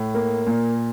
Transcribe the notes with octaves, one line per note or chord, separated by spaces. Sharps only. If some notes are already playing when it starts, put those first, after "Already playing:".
Already playing: A2
A#3
A#2